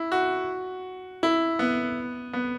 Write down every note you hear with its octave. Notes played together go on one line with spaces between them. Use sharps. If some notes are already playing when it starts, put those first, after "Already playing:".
Already playing: E4
F#4
E4
B3
B3